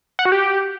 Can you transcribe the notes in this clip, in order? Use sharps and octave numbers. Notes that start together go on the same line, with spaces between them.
F#5
F#4
G4